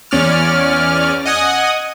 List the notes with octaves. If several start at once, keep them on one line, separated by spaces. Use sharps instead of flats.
E2 C#4 D5 F6
D#5 F#5 G#5 D#6